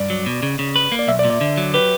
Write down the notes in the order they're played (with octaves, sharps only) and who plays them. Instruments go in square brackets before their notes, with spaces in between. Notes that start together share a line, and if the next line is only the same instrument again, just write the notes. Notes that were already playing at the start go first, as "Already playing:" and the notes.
Already playing: [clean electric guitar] G2 [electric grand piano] D5
[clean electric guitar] F#3
B2
C#3
C#3
B4
A#3
[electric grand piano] D5
[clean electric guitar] B1 [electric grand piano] E5
[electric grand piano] D5
[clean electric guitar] A#2
[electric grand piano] D5
[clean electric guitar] D3
F#3
[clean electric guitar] G4 [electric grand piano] B4